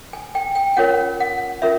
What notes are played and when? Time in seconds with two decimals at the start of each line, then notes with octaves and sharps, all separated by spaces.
0.13 G#5
0.35 G5
0.55 G5
0.77 C#4 F4 A#4 C#5 F#5
1.20 F#5
1.62 C#4 F4 A#4 E5